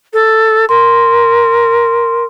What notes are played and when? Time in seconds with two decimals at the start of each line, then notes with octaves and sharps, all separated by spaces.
0.13 A4
0.69 A#4 C6